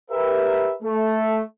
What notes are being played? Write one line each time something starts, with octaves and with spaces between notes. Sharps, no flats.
G4 A#4 B4 E5
A3